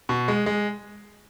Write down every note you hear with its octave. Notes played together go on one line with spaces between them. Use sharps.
B2
G#3
G#3